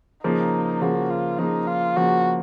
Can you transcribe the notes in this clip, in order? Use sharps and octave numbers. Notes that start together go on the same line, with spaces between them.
C#3 F3 A#3 D#4
C#3 F3 A#3 F#4
F4
C#3 F3 A#3 D#4
F4
C#3 F3 A#3 F#4